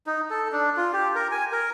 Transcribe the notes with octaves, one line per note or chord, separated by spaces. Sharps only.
D#4
A4
D4
F4
G4
A#4
G#5
A#4